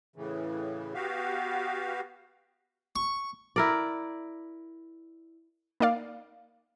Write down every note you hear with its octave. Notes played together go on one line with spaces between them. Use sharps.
A2 C#3 E3
B3 F#4 G4 F5
C#6
E4 A#4 D5
A#3 D#4 D5 F5